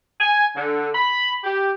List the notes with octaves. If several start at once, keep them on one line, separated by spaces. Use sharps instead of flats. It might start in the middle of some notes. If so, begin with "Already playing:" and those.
G#5
D3
B5
G4